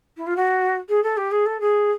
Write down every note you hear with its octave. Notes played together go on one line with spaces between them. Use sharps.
E4
F4
F#4
G#4
A4
G4
G#4
A4
G#4